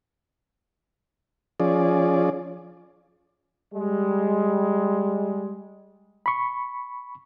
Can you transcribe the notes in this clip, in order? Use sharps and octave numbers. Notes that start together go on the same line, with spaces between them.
F3 C#4 G#4 D5
G3 G#3
B5 C#6